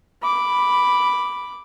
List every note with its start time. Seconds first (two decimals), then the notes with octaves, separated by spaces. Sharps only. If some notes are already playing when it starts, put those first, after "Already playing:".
0.22 B5 D6